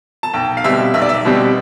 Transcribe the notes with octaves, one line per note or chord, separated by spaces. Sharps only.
A5
B1 G5
F5
B2 G3 C4 E5
B1 E5
D5
E5
B2 G3 C4